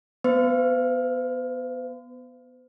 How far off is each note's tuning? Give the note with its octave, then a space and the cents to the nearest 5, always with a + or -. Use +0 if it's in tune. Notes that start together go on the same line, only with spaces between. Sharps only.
B3 +0 C5 -45